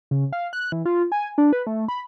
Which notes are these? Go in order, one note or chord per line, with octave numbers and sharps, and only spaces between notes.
C#3
F5
F#6
E3
F4
G#5
D4
B4
A3
B5